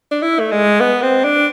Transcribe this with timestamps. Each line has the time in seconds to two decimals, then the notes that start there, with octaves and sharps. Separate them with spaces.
0.12 D4
0.22 E4
0.40 A3
0.52 G#3
0.81 B3
1.02 C4
1.25 D4